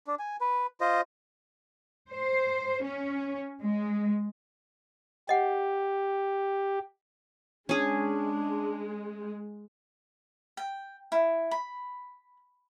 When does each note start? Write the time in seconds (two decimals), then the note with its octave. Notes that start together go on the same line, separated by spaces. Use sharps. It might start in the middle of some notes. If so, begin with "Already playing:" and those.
0.07 D4
0.19 G#5
0.41 B4
0.81 F4 C5 D#5
2.10 C5
2.84 C#4
3.62 G#3
5.29 G4 D#5 F#5
7.69 G#3 C#4 D4 G#4
10.57 G5
11.12 E4
11.51 B5